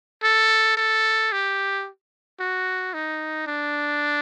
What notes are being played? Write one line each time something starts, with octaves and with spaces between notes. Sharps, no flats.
A4
A4
G4
F#4
D#4
D4